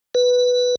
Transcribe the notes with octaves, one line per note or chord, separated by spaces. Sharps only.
B4